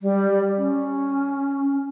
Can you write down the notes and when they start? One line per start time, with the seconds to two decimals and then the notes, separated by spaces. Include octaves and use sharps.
0.01 G3
0.58 C#4